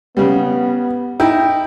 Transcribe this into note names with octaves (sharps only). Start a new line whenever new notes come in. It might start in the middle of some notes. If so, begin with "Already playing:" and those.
C#3 G3 B3
D#4 E4 G5